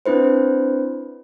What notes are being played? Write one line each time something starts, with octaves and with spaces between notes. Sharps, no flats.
C4 D4 E4 B4 C5